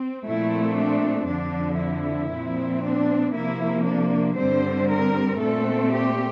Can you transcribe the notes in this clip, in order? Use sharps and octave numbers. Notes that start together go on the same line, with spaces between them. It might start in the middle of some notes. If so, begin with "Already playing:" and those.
Already playing: C4
A#2 F3 A3 C4 E4
D4
F2 D3 F3 D4
E4
A#2 F3 C4
D4
C3 F3 A#3 E4
D4
G2 D3 G3 C4 C5
A#4
A#2 A3 C4 A4
G4